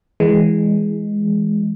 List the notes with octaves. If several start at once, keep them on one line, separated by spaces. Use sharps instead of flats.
E3 G#3